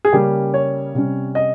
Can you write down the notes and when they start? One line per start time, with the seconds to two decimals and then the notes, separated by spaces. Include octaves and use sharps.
0.05 G#4
0.13 C#3 G3 A#3 C#4 G4
0.54 C#5
0.94 C3 G3 C#4
1.35 D#5